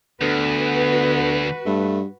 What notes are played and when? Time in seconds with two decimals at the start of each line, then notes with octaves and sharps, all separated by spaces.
0.22 D2 D3 B3 F#4 B4
1.66 G2 A3